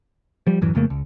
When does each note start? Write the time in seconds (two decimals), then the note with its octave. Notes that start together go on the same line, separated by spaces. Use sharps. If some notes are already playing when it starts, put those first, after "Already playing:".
0.47 F3 G3
0.61 D1 F#2 E3
0.75 F2 C#3 A3 A#3
0.90 C#2